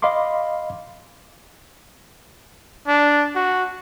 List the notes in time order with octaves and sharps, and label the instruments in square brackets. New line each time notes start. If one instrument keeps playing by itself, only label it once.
[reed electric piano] D#5 F5 B5 C6 D6
[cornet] D4
F#4